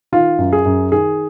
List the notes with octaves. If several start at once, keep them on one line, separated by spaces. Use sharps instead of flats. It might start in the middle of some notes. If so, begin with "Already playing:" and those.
D#3 F4
F#2
G#4
F#2
D#3 G#4